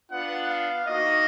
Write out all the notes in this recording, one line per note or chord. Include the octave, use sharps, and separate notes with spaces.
B3 D4 F4 F#5
F5
A#3 D#4 F#4 D#5